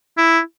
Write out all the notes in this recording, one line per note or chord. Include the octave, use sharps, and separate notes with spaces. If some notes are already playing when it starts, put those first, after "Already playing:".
E4